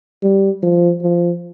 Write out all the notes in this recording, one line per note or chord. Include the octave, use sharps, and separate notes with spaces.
G3
F3
F3